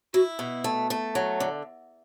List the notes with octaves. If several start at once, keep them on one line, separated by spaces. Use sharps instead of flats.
E4 F#4
B2
A3
A3
F#3
D3